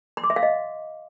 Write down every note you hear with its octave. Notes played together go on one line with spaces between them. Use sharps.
C6
D6
E5
F5
D#5